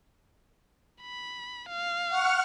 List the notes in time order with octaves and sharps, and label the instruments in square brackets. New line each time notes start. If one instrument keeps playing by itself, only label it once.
[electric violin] B5
F5
[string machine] F#5 C#6 F6